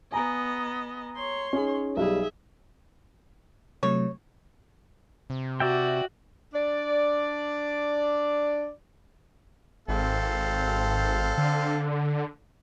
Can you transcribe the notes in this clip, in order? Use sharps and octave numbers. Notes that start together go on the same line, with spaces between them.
B3 D#5 G#5 A#5
C#5 C6
C#4 D#4 G#4
B1 G3 G#4 E5
C3 F#3 A3 C#5
C3
F#4 D5 E5 G5
D4 D5
G#1 C4 A4 F5
D3